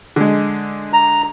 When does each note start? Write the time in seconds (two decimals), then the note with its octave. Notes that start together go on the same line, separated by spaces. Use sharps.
0.16 D3 G#3
0.93 A#5